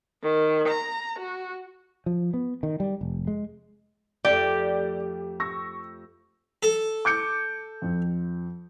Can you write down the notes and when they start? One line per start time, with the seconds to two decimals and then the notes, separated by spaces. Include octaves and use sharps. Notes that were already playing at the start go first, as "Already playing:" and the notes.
0.23 D#3
0.68 A#5
1.19 F#4
2.06 F3
2.34 B3
2.63 D#3
2.80 G3
3.01 F1
3.27 G#3
4.25 F2 A3 F4 G4 D5
5.40 C#6 E6 A#6
6.63 A4
7.05 D6 G6 C#7
7.82 F2